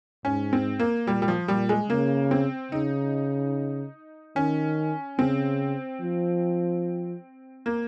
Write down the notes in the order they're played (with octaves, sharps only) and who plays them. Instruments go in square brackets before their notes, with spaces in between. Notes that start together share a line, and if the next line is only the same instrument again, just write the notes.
[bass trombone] G#2 [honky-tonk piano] C#4
[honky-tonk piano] C4
A#3
[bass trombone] A#2 [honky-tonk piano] G3
[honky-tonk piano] G3
F3
[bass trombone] A#2 [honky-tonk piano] G3
[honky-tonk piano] G#3
[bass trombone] C#3 [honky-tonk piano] A#3
[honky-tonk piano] C4
[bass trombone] C#3 [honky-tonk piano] D#4
[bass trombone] D#3 [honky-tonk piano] C#4
[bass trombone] C#3 [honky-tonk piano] C4
[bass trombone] F3
[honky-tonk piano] A#3